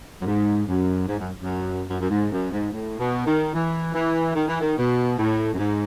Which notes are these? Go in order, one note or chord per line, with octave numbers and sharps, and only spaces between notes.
F#2
G#2
F#2
G#2
F#2
F#2
F#2
F#2
G#2
F#2
G#2
A2
B2
D#3
E3
E3
D#3
E3
D#3
B2
A2
F#2
G#2